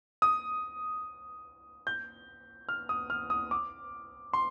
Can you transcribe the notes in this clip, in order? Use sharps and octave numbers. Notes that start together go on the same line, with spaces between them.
D#6
G6
F6
D#6
F6
D#6
D6
C6